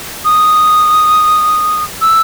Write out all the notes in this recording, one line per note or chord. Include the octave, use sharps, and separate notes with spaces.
D#6
E6